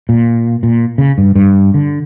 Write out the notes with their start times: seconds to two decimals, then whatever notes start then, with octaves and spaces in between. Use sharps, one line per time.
0.09 A#2
0.63 A#2
0.98 C#3
1.18 G2
1.35 G2
1.74 D3